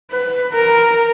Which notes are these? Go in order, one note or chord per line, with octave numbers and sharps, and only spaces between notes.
B4
A#4